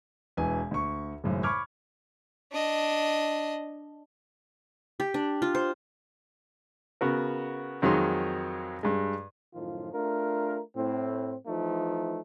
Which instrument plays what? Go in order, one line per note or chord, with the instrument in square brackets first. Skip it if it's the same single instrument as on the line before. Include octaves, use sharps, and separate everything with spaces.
[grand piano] E1 E3 G#5
D2 C#6
G#1 F#2 A2 C#3
B5 C#6 D6 F6 G#6
[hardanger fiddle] D4 D#5
[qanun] G4
D4
F4
C5
[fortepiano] C#3 B3 F#4 A#4
F2 D#3 F#3 G#3 C#5 C6
G2 G#3
[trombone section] F#2 A2 D#3 F3 F4
A3 D4 F4 A#4
A2 C4
E3 F3 A3 D#4